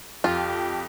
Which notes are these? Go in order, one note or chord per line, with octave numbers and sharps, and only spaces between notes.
F2 F4 G4